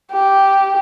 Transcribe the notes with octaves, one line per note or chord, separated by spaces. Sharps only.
G4